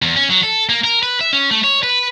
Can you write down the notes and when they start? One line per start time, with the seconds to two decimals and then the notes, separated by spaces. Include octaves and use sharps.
0.02 E2
0.16 C#4
0.30 F#3
0.43 A4
0.69 A#3
0.84 A#4
1.03 B4
1.21 E5
1.33 C#4
1.51 A3
1.64 C#5
1.83 B4